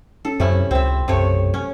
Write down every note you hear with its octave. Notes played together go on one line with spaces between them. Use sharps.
C#4 A4
F#2 C3 C#4 E4
C#2 C4 E5
B1 F#2 C3 A3 C#5
C#4